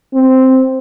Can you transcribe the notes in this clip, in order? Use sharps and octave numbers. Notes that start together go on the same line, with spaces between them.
C4